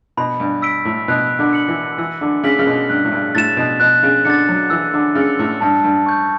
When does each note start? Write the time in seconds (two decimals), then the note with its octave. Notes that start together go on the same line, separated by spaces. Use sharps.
0.17 B2 B5
0.40 G2
0.62 E6 B6 D7
0.85 A2
1.08 B2 F#6
1.39 D3
1.53 C#7 F#7
1.68 E3
1.98 E3 E6
2.21 D3
2.43 C#3 B6 F#7
2.59 C#3
2.66 B2
2.89 G2 F#6
3.05 A2
3.12 G2
3.35 A2 A6 E7
3.57 B2
3.80 B2 F#6
4.03 C#3
4.25 D3 A6 C#7
4.49 F#3
4.70 E3 E6
4.94 D3
5.15 C#3 A6 C#7
5.39 A2
5.61 G2 A5
5.84 G2
6.06 C#6 G6